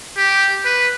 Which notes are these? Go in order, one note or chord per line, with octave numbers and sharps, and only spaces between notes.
G4
B4